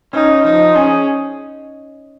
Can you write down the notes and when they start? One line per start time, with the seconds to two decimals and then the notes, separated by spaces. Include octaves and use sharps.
0.13 C#4 D#4
0.45 F3 D#4
0.76 C#4 G#4